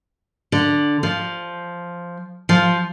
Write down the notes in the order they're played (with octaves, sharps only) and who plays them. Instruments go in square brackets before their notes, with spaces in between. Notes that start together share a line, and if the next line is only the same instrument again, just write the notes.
[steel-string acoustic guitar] D3
F3
F3